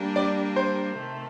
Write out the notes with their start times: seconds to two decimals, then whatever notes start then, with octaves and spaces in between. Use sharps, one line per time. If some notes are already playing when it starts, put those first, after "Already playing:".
Already playing: G3 A#3 D4
0.16 D5
0.56 C5
0.97 C3 D#3 A3